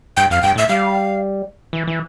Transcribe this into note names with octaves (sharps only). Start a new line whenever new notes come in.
G2 G5
F2 F5
G2 G5
A2 E5
G3 F5
E3
E3